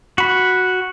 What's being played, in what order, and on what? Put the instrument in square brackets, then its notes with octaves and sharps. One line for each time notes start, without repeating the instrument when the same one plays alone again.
[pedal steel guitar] F#4 B5